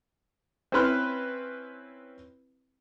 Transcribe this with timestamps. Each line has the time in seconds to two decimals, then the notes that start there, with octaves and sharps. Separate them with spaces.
0.72 C4 C#4 E4 B4 C6 F6